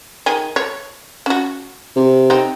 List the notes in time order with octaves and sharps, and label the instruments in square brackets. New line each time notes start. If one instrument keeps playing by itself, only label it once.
[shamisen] D#3 G#4 G#5
C#5
C#4 F#4
[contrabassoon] C3
[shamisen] C4 D#4